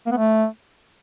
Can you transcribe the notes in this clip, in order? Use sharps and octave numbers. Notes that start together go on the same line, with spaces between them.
A#3
B3
A3